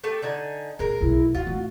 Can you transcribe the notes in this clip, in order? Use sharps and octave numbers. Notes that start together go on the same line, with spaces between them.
A3 G4 A4
D3 D#4 G#5
A#2 G#3 A#4
B1 A2 E4
D#2 F4 F#4
A2